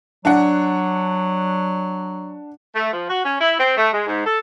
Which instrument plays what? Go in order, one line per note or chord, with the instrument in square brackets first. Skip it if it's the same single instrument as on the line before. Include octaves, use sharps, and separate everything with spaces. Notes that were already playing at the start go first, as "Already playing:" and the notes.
[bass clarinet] F#3 [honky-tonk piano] D4 F#5
[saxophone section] A3
F3
F#4
C#4
E4
C4
A3
G#3
G#2
A4